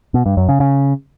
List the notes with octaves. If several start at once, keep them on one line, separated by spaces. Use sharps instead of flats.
B2
G2
F#2
C#3
C#3